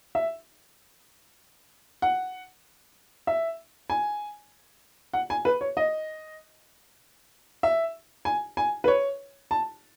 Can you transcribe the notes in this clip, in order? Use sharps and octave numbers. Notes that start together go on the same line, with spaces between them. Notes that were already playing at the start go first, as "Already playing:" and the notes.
E5
F#5
E5
G#5
F#5
G#5
B4
C#5
D#5
E5
G#5
G#5
B4
C#5
A5